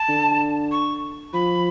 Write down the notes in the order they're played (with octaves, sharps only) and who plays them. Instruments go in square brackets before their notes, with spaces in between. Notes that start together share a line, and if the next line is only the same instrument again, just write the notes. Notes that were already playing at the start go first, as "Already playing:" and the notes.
Already playing: [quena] A5
[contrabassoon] D3
[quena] C#6
[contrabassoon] F3 [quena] B5